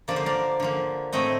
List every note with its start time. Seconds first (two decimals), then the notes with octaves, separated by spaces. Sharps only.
0.08 D3 F3 A#3 D5
0.16 C5
0.26 A#4 D5
0.60 D3 F3 A#3
1.12 A2 A3 C4 D#5 G5